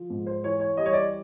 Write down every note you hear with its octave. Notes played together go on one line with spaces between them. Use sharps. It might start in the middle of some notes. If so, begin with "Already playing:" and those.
Already playing: F3
G#2
C5
E3 C#5
C#5
G3 D#5
C#5
D5